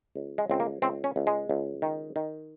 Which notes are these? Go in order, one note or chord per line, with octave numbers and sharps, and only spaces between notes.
C#2
G#3
C#2 C4
A#3
C#2 C4
C#4
C#2
G#3
C#2
D#3
D#3